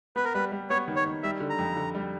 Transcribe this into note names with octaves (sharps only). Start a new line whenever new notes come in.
B3 B4
A#4
G3 B4
G3
B3 C#5
D#3
C#5
D#3
G3 E5
D3
A#5
F2
D3
G3